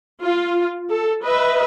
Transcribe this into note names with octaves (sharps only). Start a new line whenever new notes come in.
F4
A4
B4 D#5 E5